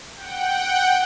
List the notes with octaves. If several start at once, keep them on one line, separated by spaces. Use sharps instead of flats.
F#5 G5